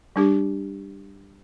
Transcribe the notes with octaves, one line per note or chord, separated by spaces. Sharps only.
G3 D4 G4